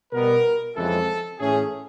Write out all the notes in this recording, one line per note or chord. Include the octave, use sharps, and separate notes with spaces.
B2 G3 B3 A#4
F2 C#3 E3 G#3 C4 A4
A2 E3 A3 C#4 G#4